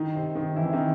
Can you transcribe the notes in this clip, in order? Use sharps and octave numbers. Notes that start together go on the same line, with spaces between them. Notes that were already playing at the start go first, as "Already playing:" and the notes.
Already playing: D#3 D#4
C3 C4
D#3 D#4
E3 E4
C4
D#3 D#4